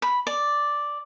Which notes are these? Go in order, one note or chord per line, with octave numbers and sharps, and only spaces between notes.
B5
D5